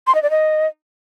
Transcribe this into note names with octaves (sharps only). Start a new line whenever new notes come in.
C6
D#5
D5
D#5